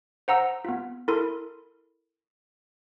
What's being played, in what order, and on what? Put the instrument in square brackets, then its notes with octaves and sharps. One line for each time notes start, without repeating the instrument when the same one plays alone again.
[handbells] C5 F#5 A#5 E6
B3 F4
E4 A4 A#4 C6